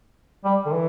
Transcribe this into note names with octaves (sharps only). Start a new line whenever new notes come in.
G3
D3
E3